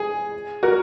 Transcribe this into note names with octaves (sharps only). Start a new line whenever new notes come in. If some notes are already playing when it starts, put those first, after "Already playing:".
Already playing: G#4
F#4 A#4